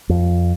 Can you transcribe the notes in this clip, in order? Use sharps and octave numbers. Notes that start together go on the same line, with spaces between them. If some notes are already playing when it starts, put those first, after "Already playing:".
F2